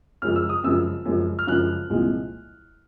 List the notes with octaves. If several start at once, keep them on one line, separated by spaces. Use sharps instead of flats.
F#2 C#3 F3 G#3 F6
E6
D#6
F#2 C#3 F3 G#3 E6
F#2 C#3 F3 G#3
F6
F#2 C#3 F3 G#3 F#6
C2 A#2 F3 G#3